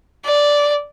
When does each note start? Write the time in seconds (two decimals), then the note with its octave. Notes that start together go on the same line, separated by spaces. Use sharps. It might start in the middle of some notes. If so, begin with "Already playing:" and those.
0.24 D5